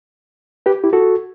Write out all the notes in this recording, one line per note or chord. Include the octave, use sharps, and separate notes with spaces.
G4 B4
E4 G4
F#4 A4